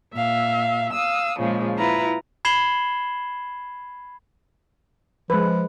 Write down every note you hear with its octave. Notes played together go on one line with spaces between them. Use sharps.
A#2 E5 F5
F5 D#6 E6
A#2 C#3 F3 G#3
E4 F4 B4 A#5
B5 G#6 C7 E7 F#7 G7
F3 G#3 B4